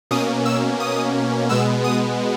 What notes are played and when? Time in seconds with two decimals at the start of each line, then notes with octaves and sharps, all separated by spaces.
0.11 B2 A#3 C#4 D#6
0.46 E6
0.80 D#6
1.49 B2 G#3 B3 E6
1.84 D#6